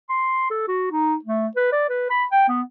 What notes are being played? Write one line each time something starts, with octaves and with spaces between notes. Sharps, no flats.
C6
A4
F#4
D#4
A3
B4
D5
B4
B5
G5
B3